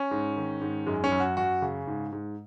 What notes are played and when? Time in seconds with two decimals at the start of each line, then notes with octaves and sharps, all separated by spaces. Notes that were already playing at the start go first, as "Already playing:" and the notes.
Already playing: C#4
0.11 G#2
0.36 D#3
0.61 G#2
0.87 F#2 G#3
1.04 C#4
1.12 F#2
1.20 F#4
1.37 F#2 F#4
1.62 C#3
1.87 G#2
2.12 G#2